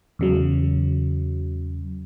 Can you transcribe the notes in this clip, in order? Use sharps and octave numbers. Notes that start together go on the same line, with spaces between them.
E2 C#3 F#3